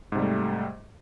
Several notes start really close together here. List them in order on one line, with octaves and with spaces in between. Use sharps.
G#2 C3 G3 A3